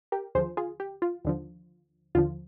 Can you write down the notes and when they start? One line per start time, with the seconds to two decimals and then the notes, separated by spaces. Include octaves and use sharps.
0.12 G4 A#4
0.35 D#2 D3 F3 G#4 C5
0.57 F4 G#4
0.80 G4
1.02 F4
1.25 D#2 D3 F3
2.15 D#2 D3 F3 F4